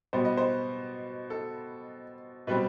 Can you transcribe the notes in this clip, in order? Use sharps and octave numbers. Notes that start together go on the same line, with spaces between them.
B2 G3 B3 C5
D#5
C5
A4
B2 G3 C4 B4